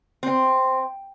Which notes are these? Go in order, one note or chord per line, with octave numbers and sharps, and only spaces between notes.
C4